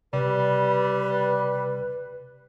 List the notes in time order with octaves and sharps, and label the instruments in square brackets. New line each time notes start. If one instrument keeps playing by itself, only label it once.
[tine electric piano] C3 [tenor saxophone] G3 [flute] B4